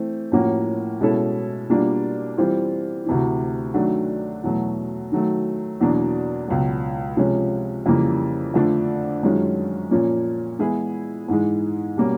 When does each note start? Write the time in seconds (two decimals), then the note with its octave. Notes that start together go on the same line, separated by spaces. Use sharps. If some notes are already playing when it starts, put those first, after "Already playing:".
Already playing: E3 A3 C4
0.32 A2 F3 A#3 C#4 F#4
1.00 B2 G#3 C#4 E4 A4
1.69 B2 G3 A#3 D4 F4
2.38 E3 G3 C4 F4
3.06 D2 C3 E3
3.74 D#3 F#3 A3 D4 F#4
4.43 E2 B2 F#3 A3
5.12 D#3 F#3 A3
5.80 E2 B2 F#3 A#3 D4
6.48 C#2 B2 F#3
7.17 C3 F3 G#3 C#4
7.86 F2 C#3 E3 G3 A#3
8.54 F2 D3 F3 A3 D4
9.23 F#2 D#3 G#3 C#4 F4
9.91 A#2 F3 A#3 C#4
10.59 E3 G#3 B3 E4 G#4
11.28 G#2 E3 G#3
11.96 B2 G3 A#3 C#4